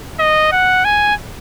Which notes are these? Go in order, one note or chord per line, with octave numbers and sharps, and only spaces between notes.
D#5
F#5
G#5